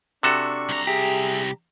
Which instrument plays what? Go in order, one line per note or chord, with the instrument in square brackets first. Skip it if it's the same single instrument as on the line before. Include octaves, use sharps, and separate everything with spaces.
[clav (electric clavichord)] C3 F#4 A4 [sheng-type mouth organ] D4 C#6
[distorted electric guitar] C2 A#5
[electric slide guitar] G4 [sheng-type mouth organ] G#4 E5